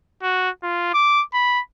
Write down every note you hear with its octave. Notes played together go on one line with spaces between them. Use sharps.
F#4
F4
D6
B5